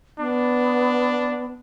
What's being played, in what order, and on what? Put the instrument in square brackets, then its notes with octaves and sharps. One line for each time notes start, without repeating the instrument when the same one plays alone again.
[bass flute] B3 [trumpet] D4